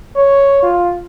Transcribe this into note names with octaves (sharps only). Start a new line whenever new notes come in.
C#5
F4